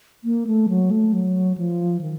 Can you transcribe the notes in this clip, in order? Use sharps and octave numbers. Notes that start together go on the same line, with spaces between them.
A#3
A3
F#3
A3
F#3
F3
D#3